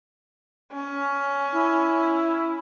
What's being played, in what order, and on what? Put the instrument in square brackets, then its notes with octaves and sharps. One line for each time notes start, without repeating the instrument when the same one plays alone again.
[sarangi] C#4
[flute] E4